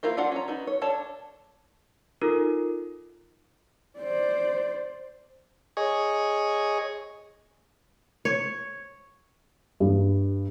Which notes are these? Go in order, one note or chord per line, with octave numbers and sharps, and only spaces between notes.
A#3 E4 F4 A#4 C5
D4 F4 F#5
C#4 A#5
B3 D#4 F#4
C#5
D4 A4 C#5 A5
D#4 F4 A4 A#4
C5 D5
G#4 C#5 D#5
C#5
G2